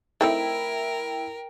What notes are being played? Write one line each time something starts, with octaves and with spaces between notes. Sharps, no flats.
A3 C4 D#4 E4 A#4 G5